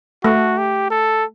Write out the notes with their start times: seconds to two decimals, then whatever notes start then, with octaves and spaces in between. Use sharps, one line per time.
0.24 A3 F#4
0.58 G4
0.90 A4